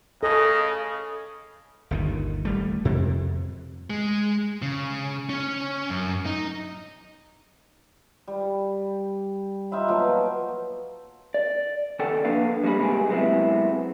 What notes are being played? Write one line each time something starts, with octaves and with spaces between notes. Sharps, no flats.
C#3 A4 D#5
G1 D#2 D#3
D#1 G3 A3
F2 C3
G#3
C#3
C#4
F#2
D#4
G3
D#4 F4 E5 B5
B2 F3 F#3 A#3
D5
D#2 C#3 A4 D5 F#5 G5
F3 A#3 D4 B4 F5
G3 G#3 A#3 B5
C2 A#2 C#3 G#3 G4 G#4
C3 F#3 G#3 B3 C4 E4